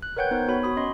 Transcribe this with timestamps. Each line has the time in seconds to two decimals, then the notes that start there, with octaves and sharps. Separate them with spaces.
0.03 F#6
0.17 A#4 B4 C#5 F#5 G5 G6
0.31 B3 D#4 C5 C#5
0.47 B3 F#4 C#5 B5
0.63 F#4 B5 D#6
0.77 C#4 D#5 C6